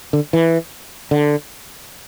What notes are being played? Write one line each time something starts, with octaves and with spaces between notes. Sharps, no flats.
D3
E3
D3